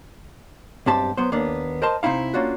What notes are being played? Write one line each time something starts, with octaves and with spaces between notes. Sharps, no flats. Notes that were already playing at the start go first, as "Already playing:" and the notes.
B1 G2 C4 G4 A5
F#3 B3 C5
D#2 A#3 B3 D4
A#4 C5 D#5 A5 C6
C3 C4 D#4 E4 F5
A#3 C#4 D4 F4 F#4